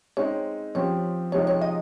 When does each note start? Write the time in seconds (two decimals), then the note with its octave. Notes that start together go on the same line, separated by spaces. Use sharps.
0.17 G#3 C4 D#4 C#5
0.75 F3 C4 G4 C#5
1.32 C3 F3 G#3 D#4 G4 C#5
1.47 C#5
1.62 D#5